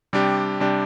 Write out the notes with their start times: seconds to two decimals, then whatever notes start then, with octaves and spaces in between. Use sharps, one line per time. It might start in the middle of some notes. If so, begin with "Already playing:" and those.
0.13 C3 G3 D4 G4
0.60 C3 G3 D4 G4